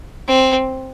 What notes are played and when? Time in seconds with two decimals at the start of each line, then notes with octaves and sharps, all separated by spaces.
0.28 C4